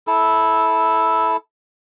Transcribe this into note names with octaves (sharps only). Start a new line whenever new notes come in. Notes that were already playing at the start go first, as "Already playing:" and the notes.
E4 A4 E6